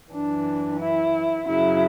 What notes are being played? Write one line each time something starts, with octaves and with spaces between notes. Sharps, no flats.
F#2 E3 D4
E4
F#2 C#3 F#3 E4